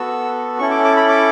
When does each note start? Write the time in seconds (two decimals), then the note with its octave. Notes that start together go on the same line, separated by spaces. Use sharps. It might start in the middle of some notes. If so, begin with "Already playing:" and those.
Already playing: B3 F#4 A4 E6
0.59 C#4 E4 A4 C#6
0.71 D6
0.84 D6
0.97 B5
1.09 D6